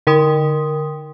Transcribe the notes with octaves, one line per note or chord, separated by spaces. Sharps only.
D3 A#4 G5 C6 D#6